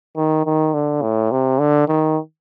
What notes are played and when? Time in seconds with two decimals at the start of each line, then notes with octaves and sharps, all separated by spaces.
0.16 D#3
0.46 D#3
0.74 D3
1.02 A2
1.31 C3
1.60 D3
1.88 D#3